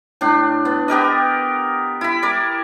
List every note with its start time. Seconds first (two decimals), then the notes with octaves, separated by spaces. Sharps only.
0.21 A2 D4
0.65 B3
0.88 B3 G4 A#4 D#5
2.01 E4 B5
2.23 A#4 D5